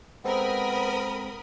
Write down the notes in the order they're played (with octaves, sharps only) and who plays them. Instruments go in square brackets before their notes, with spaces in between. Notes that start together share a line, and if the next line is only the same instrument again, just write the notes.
[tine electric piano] G#3 C4 A4 [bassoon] B3 [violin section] A#4 B5 D#6 [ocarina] C5